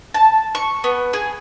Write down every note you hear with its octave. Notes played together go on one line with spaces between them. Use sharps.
A5
C#6
B3
G#4